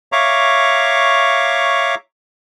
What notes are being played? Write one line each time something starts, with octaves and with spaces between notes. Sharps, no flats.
C#5 E5 F5 A#5 C#6 D6